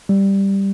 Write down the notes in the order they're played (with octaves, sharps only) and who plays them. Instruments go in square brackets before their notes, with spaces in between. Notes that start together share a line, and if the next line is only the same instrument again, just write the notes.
[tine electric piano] G3